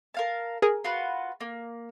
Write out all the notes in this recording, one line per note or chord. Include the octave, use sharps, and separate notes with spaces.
A#4 F5 A5
G#4 A#4
F4 F#4 B4
A#3